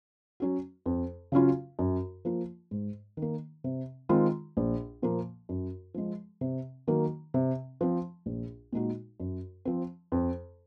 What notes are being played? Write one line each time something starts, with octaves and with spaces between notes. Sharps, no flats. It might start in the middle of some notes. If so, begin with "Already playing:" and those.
F#3 C#4 F#4
F2
C#3 F#3 C#4 F4
F#2
F3 A#3 F4
G#2
D#3
A#3
C3
D#3 G#3 C4 F4
A#1
A#2 F3 A#3
F#2
F3 G#3
C3
D#3 F#3 A#3
C3
F3 C4
A#1
A#2 G#3 D#4 F#4
F#2
F3 C4
F2